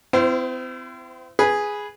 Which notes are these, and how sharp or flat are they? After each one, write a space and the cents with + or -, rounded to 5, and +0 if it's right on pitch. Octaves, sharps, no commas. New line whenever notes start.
C4 -35 E4 +35 C5 +0
G#4 +0 B4 -5